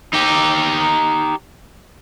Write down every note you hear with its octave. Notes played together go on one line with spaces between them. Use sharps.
D#4 G4